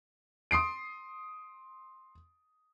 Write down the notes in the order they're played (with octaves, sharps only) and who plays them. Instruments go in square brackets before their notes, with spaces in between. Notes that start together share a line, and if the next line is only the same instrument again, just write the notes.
[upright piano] C6 D#6 C7 D7